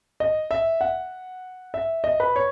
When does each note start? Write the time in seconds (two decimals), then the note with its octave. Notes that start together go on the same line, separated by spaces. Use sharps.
0.20 D#5
0.51 E5
0.81 F#5
1.74 E5
2.04 D#5
2.20 B4
2.36 C#5